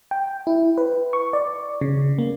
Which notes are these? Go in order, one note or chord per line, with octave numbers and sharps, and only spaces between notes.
G5
E4
B4
C#6
D5
C#3
A#3